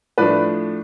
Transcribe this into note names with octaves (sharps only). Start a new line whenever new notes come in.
A2 F3 A3 D4 B4 D5